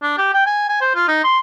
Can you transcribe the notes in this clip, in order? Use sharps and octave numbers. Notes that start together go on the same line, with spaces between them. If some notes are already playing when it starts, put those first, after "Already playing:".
D4
G4
G5
G#5
G#5
C5
F4
D#4
C6